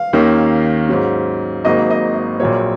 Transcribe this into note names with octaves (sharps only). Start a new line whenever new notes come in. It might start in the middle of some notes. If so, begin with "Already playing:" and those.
Already playing: F5
D#2 D#3 A#3 C#4
G#2 F#3 C#4
G#1 G#2 F#3 A#3 D#5
D#5
D#5
A#1 A#2 F#3 A#3 C#5